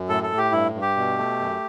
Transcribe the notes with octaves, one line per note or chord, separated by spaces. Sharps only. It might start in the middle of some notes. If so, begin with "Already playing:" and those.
Already playing: F#2
A2 A4
A4
A2
G4
G2 E4
G2
G4
B2
A3
F#2